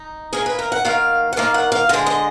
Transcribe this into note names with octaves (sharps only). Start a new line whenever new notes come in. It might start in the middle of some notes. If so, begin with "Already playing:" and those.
Already playing: D#4
D#3 A#3 G#4
B4
A#4
F#5
D#3 A#3 F5
F#5
D#3 A#3 F5
F#5
F5
D3 G#3 D#5
D#5